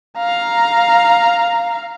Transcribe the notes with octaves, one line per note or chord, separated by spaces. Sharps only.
F5 A#5